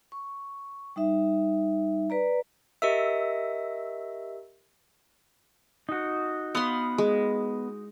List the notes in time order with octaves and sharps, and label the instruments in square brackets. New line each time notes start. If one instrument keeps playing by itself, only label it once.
[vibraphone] C#6
G3 D#4 E5
B4 D5 A#5
[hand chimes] G4 A#4 E6 [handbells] D#5 E5
[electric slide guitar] D#4 F#4
[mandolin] B3 B5 D#6 [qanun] F5 C6
[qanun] G#3